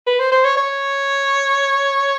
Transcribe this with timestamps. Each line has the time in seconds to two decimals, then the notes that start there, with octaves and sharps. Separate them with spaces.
0.07 B4
0.19 C5
0.32 C5
0.45 C#5
0.57 C#5